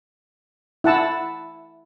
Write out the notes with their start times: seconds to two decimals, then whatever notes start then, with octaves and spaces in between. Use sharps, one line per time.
0.84 E4 F#5 A5 E6